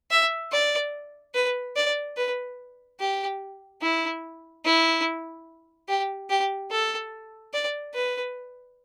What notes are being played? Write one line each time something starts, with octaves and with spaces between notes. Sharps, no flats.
E5
D5
B4
D5
B4
G4
E4
E4
G4
G4
A4
D5
B4